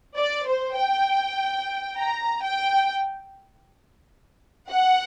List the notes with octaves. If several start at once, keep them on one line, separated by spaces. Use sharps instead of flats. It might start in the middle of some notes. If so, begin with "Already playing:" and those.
D5
C5
G5
A#5
G5
F#5